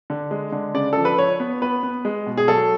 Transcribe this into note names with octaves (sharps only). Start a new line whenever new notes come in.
D3
G#3
D3
C#3 D5
F3 A4
B4
F3 C#5
B3
B3 B4
B3
G#3
B2
G#4
F#3 A4